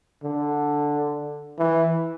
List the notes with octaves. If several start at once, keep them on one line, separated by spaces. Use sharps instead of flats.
D3
E3